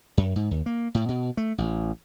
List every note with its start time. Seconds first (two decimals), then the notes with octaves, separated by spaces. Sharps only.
0.17 F#2
0.36 G#2
0.51 D#2
0.66 A#3
0.95 A2
1.09 B2
1.37 A3
1.58 A1